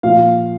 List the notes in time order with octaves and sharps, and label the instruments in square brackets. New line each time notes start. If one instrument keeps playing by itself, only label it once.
[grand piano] A#2 F3 F5